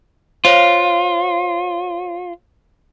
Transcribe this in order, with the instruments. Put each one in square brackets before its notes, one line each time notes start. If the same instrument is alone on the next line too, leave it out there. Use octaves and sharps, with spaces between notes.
[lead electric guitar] F4 [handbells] C5 C#5 F5